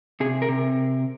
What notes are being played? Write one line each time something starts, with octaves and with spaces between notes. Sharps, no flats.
C3 G#4
A#4
C3